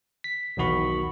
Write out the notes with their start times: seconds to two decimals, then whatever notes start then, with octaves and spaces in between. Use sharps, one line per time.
0.24 B6
0.57 B1 E2 D#3 F#4 B5 C#6